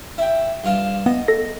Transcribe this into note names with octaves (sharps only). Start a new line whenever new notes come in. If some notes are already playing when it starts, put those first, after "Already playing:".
E4 G5
G2 F4 A5
B3 D#5
A4 A#6